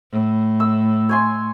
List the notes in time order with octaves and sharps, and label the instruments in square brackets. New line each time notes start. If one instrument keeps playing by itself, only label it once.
[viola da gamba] A2
[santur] E6
C#5 G#5 C6